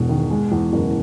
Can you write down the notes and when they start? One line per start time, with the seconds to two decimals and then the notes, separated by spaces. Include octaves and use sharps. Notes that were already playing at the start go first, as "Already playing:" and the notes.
Already playing: E1 E2 B2 G#3
0.09 D#3
0.31 G#3
0.52 E2
0.73 F#1